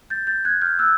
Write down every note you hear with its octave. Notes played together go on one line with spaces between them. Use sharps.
G6 A6
G6 A6
F#6 G#6
F6 G6
E6 F#6